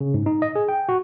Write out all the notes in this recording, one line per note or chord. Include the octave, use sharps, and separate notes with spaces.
C#3
G#2
D#4
D#5
G#4
G5
F#4